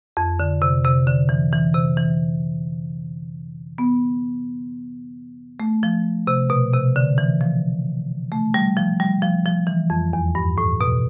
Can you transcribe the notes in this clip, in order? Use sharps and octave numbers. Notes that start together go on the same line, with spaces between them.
F2
D3
C3
C3
D3
E3
E3
C3
E3
B3
A3
F3
C3
B2
C3
D3
E3
F3
A3
G3
F3
G3
F3
F3
E3
F2
E2
G2
A2
B2